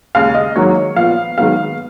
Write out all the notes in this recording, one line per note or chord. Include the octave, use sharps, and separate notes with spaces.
D#2 C#3 G#3 F5
D#5
G#2 D#3 F#3 A#3 C#5
A#2 F3 B3 F5
G#2 D#3 F#3 B3 F5